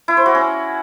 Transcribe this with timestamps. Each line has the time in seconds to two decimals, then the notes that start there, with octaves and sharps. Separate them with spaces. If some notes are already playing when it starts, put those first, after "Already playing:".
0.08 E4
0.17 C5
0.26 F#4
0.35 C#4